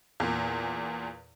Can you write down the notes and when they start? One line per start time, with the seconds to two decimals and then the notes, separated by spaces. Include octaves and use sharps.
0.20 E2 A#2